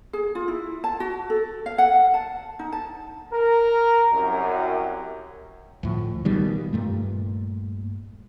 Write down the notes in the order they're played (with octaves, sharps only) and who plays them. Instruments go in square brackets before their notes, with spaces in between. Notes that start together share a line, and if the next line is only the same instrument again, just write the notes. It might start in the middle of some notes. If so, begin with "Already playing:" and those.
[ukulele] G#4
F4
E4
A5
F#4
A4
F5
F#5
A5
D#4
A5
[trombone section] A#4
C2 F#2
[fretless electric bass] D2 A2 F3
B1 B2 D#3 G3
G2 A#2 A3